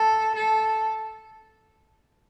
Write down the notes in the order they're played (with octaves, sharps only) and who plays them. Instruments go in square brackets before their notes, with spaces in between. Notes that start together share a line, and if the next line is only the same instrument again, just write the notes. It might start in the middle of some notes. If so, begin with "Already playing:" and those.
Already playing: [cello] A4
A4